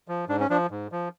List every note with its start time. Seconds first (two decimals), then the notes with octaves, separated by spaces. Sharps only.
0.08 F3
0.28 G#2 D4
0.40 C#4
0.50 F3 D4
0.71 G#2
0.92 F3